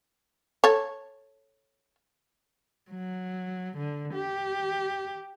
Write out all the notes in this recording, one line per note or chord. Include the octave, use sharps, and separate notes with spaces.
A4 C#5
F#3
D3
G4